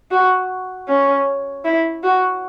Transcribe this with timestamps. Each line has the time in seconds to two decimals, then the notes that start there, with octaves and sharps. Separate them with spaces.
0.11 F#4
0.88 C#4
1.65 E4
2.04 F#4